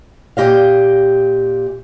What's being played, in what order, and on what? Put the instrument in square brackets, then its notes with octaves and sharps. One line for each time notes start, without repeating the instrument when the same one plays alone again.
[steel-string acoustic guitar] A#2 G4 D#5 F5